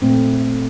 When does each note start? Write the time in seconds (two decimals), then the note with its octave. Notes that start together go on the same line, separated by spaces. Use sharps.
0.02 A#2 A3 C4